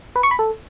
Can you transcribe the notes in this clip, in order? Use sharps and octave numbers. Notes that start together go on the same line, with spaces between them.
B4
C#6
B5
A4